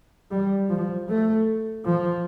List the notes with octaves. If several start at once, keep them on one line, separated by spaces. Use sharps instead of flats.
G3
F3
A3
F3